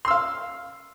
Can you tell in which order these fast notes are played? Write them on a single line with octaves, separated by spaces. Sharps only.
C6 E6 F5